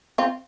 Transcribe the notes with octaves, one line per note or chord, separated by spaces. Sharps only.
C4 F4